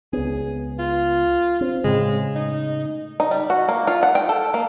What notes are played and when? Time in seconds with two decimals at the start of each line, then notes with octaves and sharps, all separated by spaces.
0.13 C#2 B3 G#4
0.79 F4
1.61 C4
1.84 A2 C#3 G#3
2.36 D#4
3.20 D#4
3.31 G3
3.50 F#4
3.69 A#3
3.87 F4
4.03 F#5
4.15 G5
4.29 A4
4.54 A#3